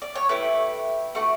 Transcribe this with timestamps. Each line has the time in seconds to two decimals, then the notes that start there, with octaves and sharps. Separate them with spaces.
0.02 D5
0.15 C#5
0.29 A3 E4 G4 B4
1.15 A3 D4 F#4